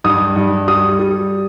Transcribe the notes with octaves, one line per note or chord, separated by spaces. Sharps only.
G2 D#6
G2
G3 D#6
G3